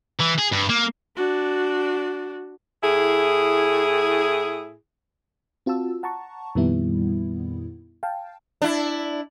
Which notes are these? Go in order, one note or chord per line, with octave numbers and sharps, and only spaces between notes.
E3
G#4
G2
A#3
D4 F#4
A2 E4 G#4
C4 F4 F#4 A5 E6
F#5 A5 A#5 C#6
F2 A#2 D#3 G3 B3 E4
F5 G5 A5
D4 E4